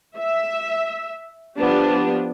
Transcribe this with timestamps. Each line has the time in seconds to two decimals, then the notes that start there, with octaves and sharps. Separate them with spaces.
0.17 E5
1.57 F3 B3 D4 G4